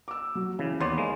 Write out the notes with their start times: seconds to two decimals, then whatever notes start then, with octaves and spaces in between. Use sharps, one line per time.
0.08 D6 E6
0.35 F#3
0.59 C#3 E3
0.80 D#2 B3 C#5 D5 B5 C6
0.98 G#3 A#3